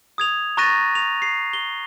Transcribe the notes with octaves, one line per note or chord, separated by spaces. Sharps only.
D#6 G#6 F7
A#5 C#6 F#6 A6 A#6 D#7
F7
C7
G7